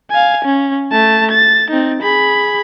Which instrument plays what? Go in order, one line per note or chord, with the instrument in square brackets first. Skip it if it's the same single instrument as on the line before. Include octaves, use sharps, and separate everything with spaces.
[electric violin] F5 G#5
C#4
A3 A5
A6
C4 D#4
G#4 B5